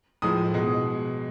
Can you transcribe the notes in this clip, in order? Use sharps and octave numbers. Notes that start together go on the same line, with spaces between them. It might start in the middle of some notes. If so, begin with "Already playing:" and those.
A2 F3 G#3 D#6
B2 G#3